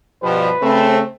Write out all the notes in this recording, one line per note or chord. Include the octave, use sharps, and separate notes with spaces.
G2 B2 F3 B4
C#3 A3 C4